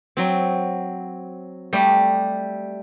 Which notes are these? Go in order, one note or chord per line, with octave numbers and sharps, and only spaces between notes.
F#3 C4
G3 A3 G4